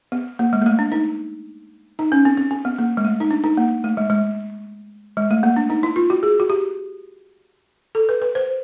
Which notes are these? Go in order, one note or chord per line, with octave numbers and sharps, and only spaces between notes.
B3
A#3
G#3
A#3
A3
D4
D#4
D#4
C#4
C4
C4
C4
B3
A#3
G#3
A3
D#4
D4
D#4
A#3
A3
G#3
G#3
G#3
A3
A#3
D4
D#4
E4
F4
F#4
G#4
F#4
G4
A4
B4
B4
C5